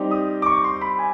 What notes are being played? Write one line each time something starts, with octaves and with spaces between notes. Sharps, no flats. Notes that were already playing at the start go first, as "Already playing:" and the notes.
Already playing: G3 C4 D#4 G4
D#6
D6
C#6
C6
B5
G#5